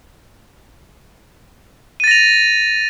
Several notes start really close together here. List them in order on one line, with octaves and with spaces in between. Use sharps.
D#7 A6 A#6 F7